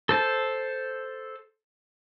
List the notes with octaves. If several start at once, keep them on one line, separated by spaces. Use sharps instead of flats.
A4 C5 A5